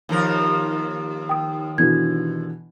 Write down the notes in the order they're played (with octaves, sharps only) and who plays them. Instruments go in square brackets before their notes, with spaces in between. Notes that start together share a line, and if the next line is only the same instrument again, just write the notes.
[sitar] D#2 F3 A#4
[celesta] G5 D#6
[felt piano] B2 D3 E3 [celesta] G#6